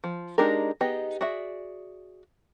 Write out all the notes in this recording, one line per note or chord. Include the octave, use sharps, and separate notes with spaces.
F3
G#3 D4 D#4 G4 A#4
B3 D#4 G4 G#4 D#5
F#4 G#4 D5 E5